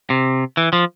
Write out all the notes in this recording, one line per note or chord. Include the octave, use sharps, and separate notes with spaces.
C3
E3
F3